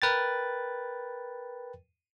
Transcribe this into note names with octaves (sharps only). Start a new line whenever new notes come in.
A#4 B4 G5 A6